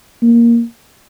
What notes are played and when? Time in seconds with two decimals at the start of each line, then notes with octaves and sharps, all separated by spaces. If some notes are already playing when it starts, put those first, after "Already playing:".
0.22 A#3